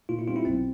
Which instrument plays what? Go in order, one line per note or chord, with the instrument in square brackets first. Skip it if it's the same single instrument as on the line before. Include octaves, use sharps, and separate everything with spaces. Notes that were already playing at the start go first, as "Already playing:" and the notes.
[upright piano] A#2 [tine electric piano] F4
[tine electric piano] E4
[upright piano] G3 C4 D#4 [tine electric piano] F4
[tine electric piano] E4
[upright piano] B1 [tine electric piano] C4